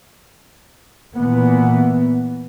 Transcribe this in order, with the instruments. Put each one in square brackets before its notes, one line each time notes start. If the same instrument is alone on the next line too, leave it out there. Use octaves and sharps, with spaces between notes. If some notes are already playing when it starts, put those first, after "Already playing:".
[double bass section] A#2 E3 B3